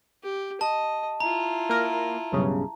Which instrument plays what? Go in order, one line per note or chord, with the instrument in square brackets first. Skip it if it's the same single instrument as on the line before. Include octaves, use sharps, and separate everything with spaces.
[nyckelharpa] G4
[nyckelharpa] D#5 [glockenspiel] A5
[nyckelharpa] E4 F4 [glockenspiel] A#5
[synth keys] A#3 A#4
B1 G2 C#3